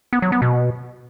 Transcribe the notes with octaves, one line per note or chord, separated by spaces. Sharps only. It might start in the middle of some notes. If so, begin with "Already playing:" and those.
B3
F#3
B3
B2